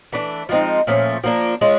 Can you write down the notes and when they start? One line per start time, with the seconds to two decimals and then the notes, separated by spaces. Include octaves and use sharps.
0.12 E3 A3 D4
0.49 F3 G#3 C4 D#4
0.87 A#2 F3 A3 C#4
1.24 F3 A#3 D4
1.61 G#3 C#4 F4